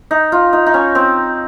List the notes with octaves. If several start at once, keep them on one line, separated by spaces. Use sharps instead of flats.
D#4
F4
D#4
D#4
C#4
C4